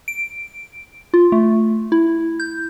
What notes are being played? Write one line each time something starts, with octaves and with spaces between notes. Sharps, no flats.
D7
F4
A3
E4
G6